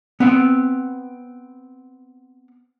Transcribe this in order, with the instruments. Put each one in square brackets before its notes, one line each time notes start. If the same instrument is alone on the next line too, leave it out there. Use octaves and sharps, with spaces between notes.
[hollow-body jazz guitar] B3 C4 F#5